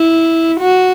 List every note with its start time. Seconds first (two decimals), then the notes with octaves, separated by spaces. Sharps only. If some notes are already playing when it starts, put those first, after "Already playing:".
Already playing: E4
0.60 F#4